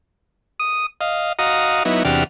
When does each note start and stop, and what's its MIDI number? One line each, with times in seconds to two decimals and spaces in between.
0.60 0.86 87
1.01 1.33 75
1.01 1.33 77
1.39 1.83 66
1.39 1.83 75
1.39 1.83 77
1.39 1.83 82
1.39 1.83 87
1.85 2.03 54
1.85 2.03 59
1.85 2.03 63
1.85 2.03 64
2.05 2.24 40
2.05 2.24 48
2.05 2.24 62
2.05 2.24 66
2.05 2.24 67
2.05 2.24 89